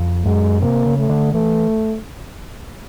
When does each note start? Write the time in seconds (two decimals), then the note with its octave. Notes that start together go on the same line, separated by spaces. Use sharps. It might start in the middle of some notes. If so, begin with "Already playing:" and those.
Already playing: F2
0.25 F#2 G#3
0.61 C3 A#3
0.86 C#3
0.98 A3
1.09 D3
1.33 E3 A3